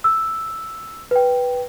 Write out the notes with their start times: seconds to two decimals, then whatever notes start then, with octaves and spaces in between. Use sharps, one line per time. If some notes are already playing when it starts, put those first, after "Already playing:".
0.04 E6
1.11 B4 G5